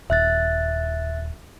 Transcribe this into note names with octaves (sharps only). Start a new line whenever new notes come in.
D#1 E5 F#6 A6